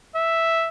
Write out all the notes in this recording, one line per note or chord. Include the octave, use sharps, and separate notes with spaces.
E5